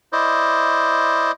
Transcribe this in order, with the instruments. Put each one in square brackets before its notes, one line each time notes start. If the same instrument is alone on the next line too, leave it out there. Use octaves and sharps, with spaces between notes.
[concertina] E4 C5 D5 D#5